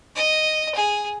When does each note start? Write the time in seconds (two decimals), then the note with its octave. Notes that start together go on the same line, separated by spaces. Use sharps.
0.16 D#5
0.75 G#4